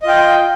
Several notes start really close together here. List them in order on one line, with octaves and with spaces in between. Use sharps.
D#5 F4 G5